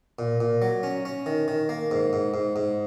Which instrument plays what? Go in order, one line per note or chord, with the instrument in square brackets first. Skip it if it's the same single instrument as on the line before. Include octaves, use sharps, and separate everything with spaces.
[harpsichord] A#2
A#2
F#3
C#4
C#4
D#3
D#3
A#3
G#2
G#2
G#2
G#2